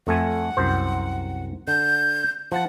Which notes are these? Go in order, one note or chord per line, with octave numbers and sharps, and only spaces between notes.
F2 A3 F#5 G#5
C2 F#2 C5
D3 G6
F3 F#5 A5